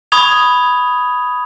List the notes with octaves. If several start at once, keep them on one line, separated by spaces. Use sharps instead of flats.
B5 C#6 D#6 G#6 F7